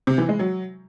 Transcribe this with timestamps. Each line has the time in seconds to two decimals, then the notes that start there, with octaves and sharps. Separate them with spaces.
0.07 C3
0.18 E3
0.29 G#3
0.39 F#3